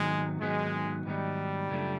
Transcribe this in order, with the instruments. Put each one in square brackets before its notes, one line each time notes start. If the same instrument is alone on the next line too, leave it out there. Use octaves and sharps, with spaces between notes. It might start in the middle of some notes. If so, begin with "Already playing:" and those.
Already playing: [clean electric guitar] G#2 D#3 F#3 B3 D#4 [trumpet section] G#3
[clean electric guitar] G#2 D#3 F#3 B3 D#4 [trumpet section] G#3
[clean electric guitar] G#2 D#3 F#3 B3 D#4 [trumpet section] G3
[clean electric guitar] F#2 C#3 F3 A3 D4